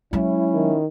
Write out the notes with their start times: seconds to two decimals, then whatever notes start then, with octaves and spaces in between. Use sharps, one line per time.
0.13 F#3 G#3 C#4 E4
0.54 D#3